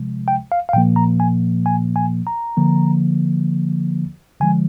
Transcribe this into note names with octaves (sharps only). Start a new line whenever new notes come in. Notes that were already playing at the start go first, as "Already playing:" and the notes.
Already playing: C3 F3 G#3
G5
F5
F5
A#2 F3 A#3 G5
A#5
G#5
G#5
G#5
A#5
D3 F3 A#3
D3 F3 G#3 G#5